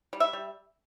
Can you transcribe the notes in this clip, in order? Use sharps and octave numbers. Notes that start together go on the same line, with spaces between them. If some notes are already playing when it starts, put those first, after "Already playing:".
G3
E5
G3